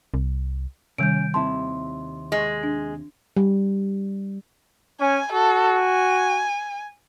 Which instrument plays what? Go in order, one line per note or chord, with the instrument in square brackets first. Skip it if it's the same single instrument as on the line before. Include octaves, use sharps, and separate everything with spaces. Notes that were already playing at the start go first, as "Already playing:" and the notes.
[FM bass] C2
[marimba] C3 D#3 G3 [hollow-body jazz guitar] C#4 [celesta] G6 D7
[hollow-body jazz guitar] D#2 C3 E4 [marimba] A5 [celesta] C6
[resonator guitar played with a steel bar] G#3
[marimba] D4
[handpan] G3
[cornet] C#4 [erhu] G#5
[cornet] F#4 [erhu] A4
[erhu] G#5